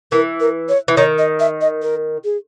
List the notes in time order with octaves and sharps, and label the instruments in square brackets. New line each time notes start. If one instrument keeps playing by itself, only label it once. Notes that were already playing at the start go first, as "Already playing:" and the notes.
[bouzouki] E3 [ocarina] A#4
[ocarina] A#4
C#5
[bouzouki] E3
[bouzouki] D#3 [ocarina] C#5
[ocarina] D#5
E5
D#5
A#4
G#4